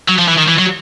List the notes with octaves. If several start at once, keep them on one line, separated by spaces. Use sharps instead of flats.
F#3
F3
E3
D#3
E3
F#3